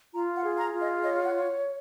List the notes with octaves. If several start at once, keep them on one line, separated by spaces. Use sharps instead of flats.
F4 A#5
F#5
G#4
A#5
F4
D#5
C#5 D#5
F#5